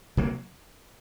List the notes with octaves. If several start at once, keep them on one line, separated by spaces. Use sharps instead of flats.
C3 F#3 A#3